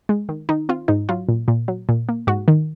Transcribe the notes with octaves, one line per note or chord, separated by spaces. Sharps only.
G#3
D#3
D#3 D#4
C4 F4
G#2 D#4
F#3 F4
A#2
A#2
F#3
A#2
A#3
G#2 F#4
D#3